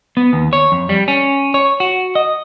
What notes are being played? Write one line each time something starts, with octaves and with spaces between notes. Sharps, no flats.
B3
D#2
C#5
F2
G3
C#4
C#5
F#4
D#5